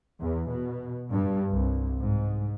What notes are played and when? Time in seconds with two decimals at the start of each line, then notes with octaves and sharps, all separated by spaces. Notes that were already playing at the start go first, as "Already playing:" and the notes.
0.20 E2
0.50 B2
1.11 G2
1.49 C2
2.01 G#2